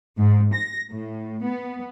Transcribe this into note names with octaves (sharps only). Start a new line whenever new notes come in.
G#2
A#6
A2
B3